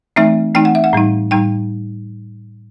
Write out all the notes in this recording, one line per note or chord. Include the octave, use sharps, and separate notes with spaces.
E3 A3 C4 D#4 E5
E3 A3 C4 D#4 G5
F#5
E5
F#5
A2 G3 D#4
A2 G3 D#4 G5